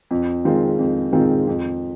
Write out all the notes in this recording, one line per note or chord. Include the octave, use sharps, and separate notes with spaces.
F2
D#3 G#3 C4 F4
F2
D#3 G#3 C4 F4
F2